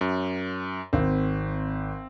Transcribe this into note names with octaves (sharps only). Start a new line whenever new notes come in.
F#2
G#1 C4